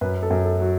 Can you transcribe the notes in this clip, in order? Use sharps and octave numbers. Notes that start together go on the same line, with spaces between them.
F#2 B4
A4
F#2
A4
F#3 F#4